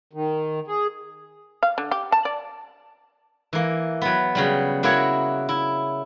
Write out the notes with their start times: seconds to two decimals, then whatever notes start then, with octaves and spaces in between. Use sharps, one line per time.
0.13 D#3
0.67 G#4
1.63 F5
1.78 D3
1.91 G4
2.12 A5
2.25 D5
3.53 E3 A#3
4.02 F#3 B3
4.35 C#3 F#3 G3
4.83 F#3 A#3 E4 F#4 C#5
5.49 E4